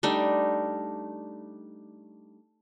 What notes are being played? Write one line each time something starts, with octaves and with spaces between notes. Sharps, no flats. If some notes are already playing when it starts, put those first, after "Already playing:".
G3 A3 D4 D#4